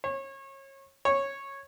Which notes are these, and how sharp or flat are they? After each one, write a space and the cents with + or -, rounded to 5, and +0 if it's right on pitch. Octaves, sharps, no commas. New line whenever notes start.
C#5 -30
C#5 -10